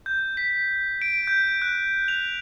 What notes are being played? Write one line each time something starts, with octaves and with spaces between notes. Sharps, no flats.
G6
B6
D7
G6
F#6
F7